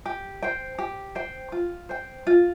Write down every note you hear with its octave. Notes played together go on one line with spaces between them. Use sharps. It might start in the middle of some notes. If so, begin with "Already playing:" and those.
G4
C5 G5
G4
C5 G5
F4
C5 G5
F4